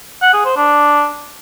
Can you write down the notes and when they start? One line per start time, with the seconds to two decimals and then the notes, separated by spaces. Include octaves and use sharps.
0.22 F#5
0.33 G#4
0.45 C5
0.56 D4